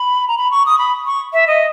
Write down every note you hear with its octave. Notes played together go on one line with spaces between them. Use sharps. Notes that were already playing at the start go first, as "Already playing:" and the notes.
Already playing: B5
A#5
B5
C#6
D#6
B5
C#6
E5
D#5